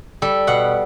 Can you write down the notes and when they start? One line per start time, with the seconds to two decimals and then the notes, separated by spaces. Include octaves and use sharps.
0.22 G3 A4
0.47 B2 F#5